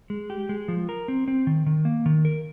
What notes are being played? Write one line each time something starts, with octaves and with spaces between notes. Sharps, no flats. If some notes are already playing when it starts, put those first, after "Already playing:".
G#3
G4
G#3
F3
A#4
C4
C4
D#3
D#3
A#3
D#3
A#4